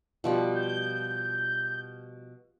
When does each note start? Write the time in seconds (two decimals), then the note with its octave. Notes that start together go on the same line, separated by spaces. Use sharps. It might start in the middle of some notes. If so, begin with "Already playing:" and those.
0.24 B2 F3 G3
0.55 G6